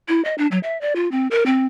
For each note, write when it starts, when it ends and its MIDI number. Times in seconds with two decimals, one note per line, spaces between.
0.08 0.23 64
0.25 0.35 75
0.38 0.47 62
0.51 0.59 54
0.63 0.79 76
0.81 0.93 74
0.96 1.10 65
1.11 1.28 60
1.31 1.45 70
1.46 1.66 60